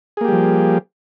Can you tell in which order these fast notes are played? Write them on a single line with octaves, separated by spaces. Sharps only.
G#4 A#3 G4 G3 F3